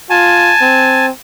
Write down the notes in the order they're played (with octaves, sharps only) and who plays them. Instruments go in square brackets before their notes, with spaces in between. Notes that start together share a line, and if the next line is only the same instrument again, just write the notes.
[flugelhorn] F4 [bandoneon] G#5 A5
[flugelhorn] C4